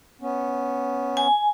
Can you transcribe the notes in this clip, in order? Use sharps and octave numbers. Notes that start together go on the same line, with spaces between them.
B3 C#4
G#5